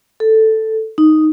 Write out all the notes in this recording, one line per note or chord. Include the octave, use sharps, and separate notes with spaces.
A4
D#4